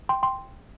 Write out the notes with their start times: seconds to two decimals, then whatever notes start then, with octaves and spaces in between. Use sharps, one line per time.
0.09 G5 C6
0.23 G5 C6